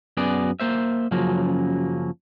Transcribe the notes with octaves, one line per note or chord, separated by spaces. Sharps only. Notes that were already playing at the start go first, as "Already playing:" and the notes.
F#2 B3 F#4 G#4 D5
A#3 C5 E5
F#2 C#3 F3 F#3 A#3